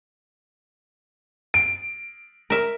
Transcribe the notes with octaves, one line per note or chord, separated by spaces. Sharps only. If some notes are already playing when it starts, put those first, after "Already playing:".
D7
A#4 E5